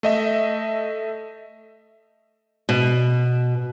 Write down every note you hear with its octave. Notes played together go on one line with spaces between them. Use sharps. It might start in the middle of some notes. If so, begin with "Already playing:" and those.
A3 D#5 E5
B2